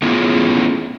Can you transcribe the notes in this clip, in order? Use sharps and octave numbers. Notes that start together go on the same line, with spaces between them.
A3 B3 C#4 E4 F4 G#4